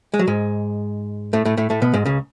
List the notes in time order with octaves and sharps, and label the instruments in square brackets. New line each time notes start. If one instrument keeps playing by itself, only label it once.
[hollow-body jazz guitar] G#3
F#3
G#2 G#3
A2 A3
A2 A3
A2 A3
A2 A3
B2 B3
G#2 G#3
C#2 C#3